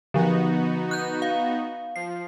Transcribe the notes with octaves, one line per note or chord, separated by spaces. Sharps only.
D3 F3 B3 D#4 F#4
F#6 G6
F5
F3 C7